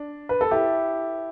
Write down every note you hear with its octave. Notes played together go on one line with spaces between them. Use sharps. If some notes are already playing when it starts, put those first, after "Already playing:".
Already playing: D4
B4
A4
E4 G4